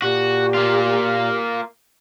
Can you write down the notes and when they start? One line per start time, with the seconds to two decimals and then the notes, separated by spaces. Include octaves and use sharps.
0.02 A#2 F#4 G4
0.54 A#3 F4